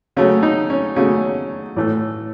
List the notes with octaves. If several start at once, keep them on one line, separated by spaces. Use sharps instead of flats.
C#3 F#3 A3 C#4
D#4
C#4
C#3 F#3 A3 C#4
A2 E3 A3